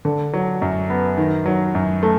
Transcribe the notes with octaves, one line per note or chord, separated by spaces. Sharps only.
D3
F#3
F#2
B3
D#3
F#3
F#2
A3